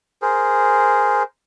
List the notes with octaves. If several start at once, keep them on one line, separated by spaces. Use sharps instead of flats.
G#4 A#4 C5